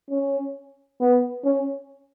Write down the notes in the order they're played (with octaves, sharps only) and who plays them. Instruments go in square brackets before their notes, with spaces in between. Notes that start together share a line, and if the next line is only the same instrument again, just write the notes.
[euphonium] C#4
B3
C#4